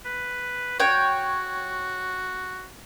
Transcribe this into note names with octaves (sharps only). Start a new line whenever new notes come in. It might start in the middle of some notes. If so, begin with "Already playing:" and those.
B4
F#4 C#5 G5